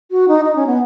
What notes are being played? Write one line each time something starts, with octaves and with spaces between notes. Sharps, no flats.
F#4
D#4
D#4
C#4
B3